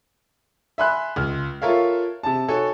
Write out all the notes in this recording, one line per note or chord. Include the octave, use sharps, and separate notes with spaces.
E5 G#5 B5 C6 F#6
C#2 F6
F4 A4 A#4 C#5 E5 F5
C3 A5
D#4 F#4 A4 C#5 G#5